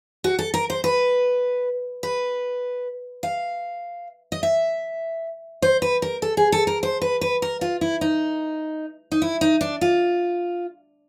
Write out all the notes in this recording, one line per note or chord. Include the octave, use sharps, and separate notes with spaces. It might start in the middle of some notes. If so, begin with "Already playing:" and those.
F#4
A4
A#4
C5
B4
B4
F5
D#5
E5
C5
B4
A#4
A4
G#4
A4
A#4
C5
B4
B4
A#4
F4
E4
D#4
D#4
E4
D#4
D4
F4